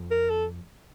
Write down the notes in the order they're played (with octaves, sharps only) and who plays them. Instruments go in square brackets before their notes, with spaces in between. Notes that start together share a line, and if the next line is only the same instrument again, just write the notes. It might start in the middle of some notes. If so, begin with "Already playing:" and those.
Already playing: [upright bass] F2
[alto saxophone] A#4
A4